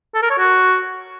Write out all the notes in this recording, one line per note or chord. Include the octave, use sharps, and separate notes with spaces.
A4
A#4
C#5
F#4